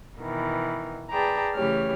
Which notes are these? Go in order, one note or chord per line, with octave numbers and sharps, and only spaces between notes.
B2 D#3 E3
G#4 B4 D5 G5 A5 A#5
C#3 E3 A3 G4 C#5 F6